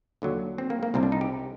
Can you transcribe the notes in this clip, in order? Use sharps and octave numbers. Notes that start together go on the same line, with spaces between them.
D#2 D3 F#3
C4
A#3
A#3
C2 C3 G3 C4
D4
D#4
G4